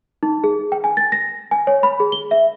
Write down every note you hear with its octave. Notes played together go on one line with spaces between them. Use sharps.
D#4
G#4
G5
G#5
A6
A#6
G#5
C#5
B5
G#4
G7
E5